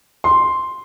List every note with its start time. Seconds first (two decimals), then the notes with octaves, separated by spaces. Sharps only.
0.24 C6